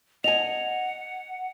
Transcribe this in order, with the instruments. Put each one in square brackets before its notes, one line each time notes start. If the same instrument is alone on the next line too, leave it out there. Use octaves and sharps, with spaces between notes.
[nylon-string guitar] D#5 G#5 [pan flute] F#5 [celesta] F7